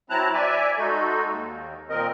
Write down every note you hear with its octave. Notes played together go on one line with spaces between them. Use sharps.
F#3 C4 E4 A5 A#5 F#6
D5 E5 G#5
G#3 D#4 F#4 A4
D#2
A#2 D#3 C4 A#4 D#5